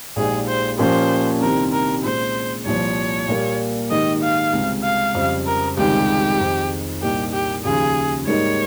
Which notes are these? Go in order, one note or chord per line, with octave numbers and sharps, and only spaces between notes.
A#1 A#2 G#3 D#4 G4 G#4
C5
A#2 F3 A#3 C#4 G4 C5
C2 C3 D#3 G3 C4 A#4
A#4
A#2 G#3 C#4 F4 C5
C2 A#2 F3 C#5
A#2 G3 A#3
G#2 D#3 A#3 D#4 G4 D#5
F5
C#2 C3 G3 C4 G4
F5
F2 C#3 G3
A#4
C#2 C3 D#3 G3 G4
F2 D#3 G#3
C2 A#2 G3 A#3 D#4 G4
G4
D#2 C#3 F3 G#4
G#2 G3 A#3 D#4 C#5